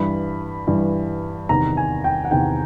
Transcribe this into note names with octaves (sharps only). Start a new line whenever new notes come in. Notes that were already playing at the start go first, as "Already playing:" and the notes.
Already playing: G2 E3 B5
G2 E3
E2 C3 D#3 A#5
G#5
G5
F#5
E2 C3 D#3 G5